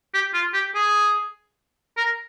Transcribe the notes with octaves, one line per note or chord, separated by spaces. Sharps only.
G4
F4
G4
G#4
A#4